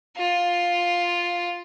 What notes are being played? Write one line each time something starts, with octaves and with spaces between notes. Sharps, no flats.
F4